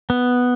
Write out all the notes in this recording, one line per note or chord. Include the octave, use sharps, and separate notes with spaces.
B3